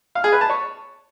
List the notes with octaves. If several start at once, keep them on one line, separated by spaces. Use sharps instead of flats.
F5
G#4
B4
A5
C#5